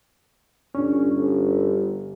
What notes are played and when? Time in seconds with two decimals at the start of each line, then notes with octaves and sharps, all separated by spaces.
0.75 G1 C#4 D4
1.12 G1